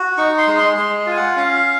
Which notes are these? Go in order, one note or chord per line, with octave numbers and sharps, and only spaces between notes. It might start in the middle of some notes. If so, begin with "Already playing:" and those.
Already playing: F#4
D#4 C#6
C6
G#3
C6
G#3 C6
F4 G#5
F#5
C#4 F5